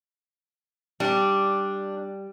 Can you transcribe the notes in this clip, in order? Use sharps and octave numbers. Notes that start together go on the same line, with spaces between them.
G3 D4